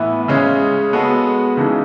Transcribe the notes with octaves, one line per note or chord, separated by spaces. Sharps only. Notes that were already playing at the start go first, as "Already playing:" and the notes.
Already playing: A2 E3 B3 E4
C#3 G#3 C#4
G#3 B3 F#4 A4
C#3 E3 G#3 D#4 A4